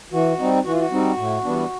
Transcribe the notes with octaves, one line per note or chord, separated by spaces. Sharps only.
E3 F#4
G3 C4 D#4
E3 F#4
F4
F#4
G3 C4 D#4
A2
E3 G3 B3 D4